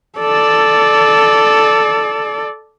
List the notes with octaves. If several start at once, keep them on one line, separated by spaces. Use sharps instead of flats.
A4 D5